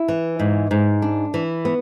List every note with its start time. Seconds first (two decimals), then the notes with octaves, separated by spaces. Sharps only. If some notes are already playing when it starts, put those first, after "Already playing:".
Already playing: E4
0.08 E3
0.39 G#2
0.71 G#2
1.02 D4
1.34 E3
1.65 B3